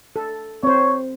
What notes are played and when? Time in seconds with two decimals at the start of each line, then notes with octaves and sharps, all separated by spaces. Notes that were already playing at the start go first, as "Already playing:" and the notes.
0.16 A4
0.63 C4 C5 C#5